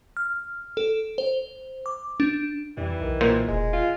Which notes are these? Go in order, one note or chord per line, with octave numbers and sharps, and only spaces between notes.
F6
A4
C5
D6
D4
F2 E3 G3
B1 D#3
A#2 A#3 C5
E1 G#3
F4